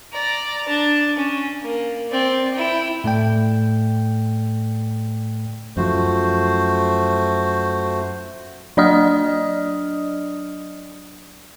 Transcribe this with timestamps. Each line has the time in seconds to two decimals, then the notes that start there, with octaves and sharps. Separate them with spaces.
0.13 D5 A#5
0.68 D4 A5
1.17 C#4
1.61 A#3
2.10 C4 D5
2.53 E4 G5
3.04 A2 A3 D5 G5
5.77 F#2 F3 A3 F#4 C5
8.77 F#3 D4 D5 D#5 D#6 F6